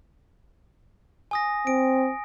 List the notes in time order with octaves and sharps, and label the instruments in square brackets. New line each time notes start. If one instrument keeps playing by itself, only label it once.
[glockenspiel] G#5 D#6 A#6
[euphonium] C4 [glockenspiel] D7